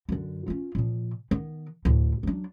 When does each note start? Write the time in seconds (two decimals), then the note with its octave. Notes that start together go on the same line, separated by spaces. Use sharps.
0.09 F#2 D3
0.48 C#4 F4
0.75 A#2 F3
1.31 D#3 B3
1.85 D2 A2
2.23 F#3 D4